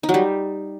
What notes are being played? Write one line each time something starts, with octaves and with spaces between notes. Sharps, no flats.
D#4
F#3
G3